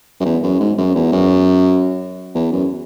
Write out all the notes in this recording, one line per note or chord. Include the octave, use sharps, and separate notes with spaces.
F#2
E2
F#2
G#2
F#2
E2
F#2
E2
F#2